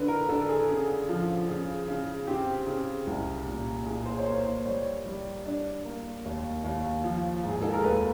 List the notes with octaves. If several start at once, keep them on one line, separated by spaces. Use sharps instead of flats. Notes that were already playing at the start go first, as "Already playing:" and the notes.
Already playing: D3 B4
A#4
D3 A4
G#4
C#3
F3
C#3
C#3
C4 G4
C#3
C2
A#2
A#2 G#4
C5
C#5
A#3 C5
C5
G3 C#5
G3
D4
A#3
D#2
D#2
F3
G#2
G#4
A4
A#4
D#2 B4